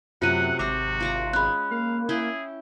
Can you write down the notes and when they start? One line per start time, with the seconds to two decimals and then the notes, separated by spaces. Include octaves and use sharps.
0.22 F#2 C3 F#3 A3 F4 F#5 F#6 D#7
0.59 G#1 C4 F#4 C5 A#5 D6
1.00 F4 D5 A#5
1.33 G#3 C#4 B5 F#6
1.71 A#3 F5
2.09 C#4 E4 G#4 G5